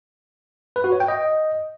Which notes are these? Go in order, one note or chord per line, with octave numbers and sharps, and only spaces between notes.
B4
F#4
C#5
G5
D#5